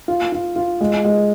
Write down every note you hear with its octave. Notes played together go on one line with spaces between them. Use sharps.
F4
F4
F4
G#3
G#3